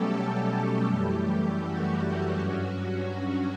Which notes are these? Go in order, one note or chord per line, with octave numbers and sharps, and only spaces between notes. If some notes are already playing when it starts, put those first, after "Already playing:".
Already playing: B2 F#3 G3 A3 C#4 G4 A4
G3 G4
F#2 E3 A3
F#4
F#4
G2 F#3 C#4 F#4